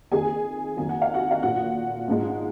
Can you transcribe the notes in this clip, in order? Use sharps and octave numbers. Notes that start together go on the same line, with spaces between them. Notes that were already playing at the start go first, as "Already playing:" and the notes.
F2 D#3 A#3 G#4 G#5
F2 D#3 F#3 A#3 G#5
F#5
F5
F#4 F#5
F5
A#2 F3 A#3 F#4 F#5
G#2 F3 G#3